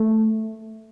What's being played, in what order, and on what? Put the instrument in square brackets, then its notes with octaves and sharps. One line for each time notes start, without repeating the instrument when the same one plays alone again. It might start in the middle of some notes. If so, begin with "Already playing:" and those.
Already playing: [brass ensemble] A3